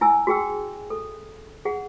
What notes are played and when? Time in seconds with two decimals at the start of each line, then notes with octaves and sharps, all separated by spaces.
0.01 E4 G#5 E6
0.27 F#4 G#4 G5 E6
0.90 A4
1.65 G#4 F#5